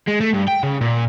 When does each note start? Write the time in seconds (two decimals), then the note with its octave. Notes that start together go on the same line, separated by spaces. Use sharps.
0.08 G#3
0.21 A3
0.34 G2
0.48 G5
0.63 C#3
0.81 A#2